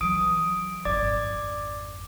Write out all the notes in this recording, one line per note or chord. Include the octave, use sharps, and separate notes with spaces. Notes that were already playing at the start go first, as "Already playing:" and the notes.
E3 F#3 D#6 D7
G#1 F2 D5 D6 A6